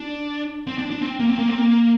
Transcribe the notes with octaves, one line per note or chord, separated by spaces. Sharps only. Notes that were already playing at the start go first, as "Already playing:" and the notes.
Already playing: D4
C4
D4
D4
C4
A#3
C4
A#3
C4
A#3